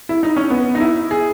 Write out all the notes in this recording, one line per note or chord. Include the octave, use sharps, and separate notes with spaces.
E4
D#4
C#4
B3
D#4
E4
G#4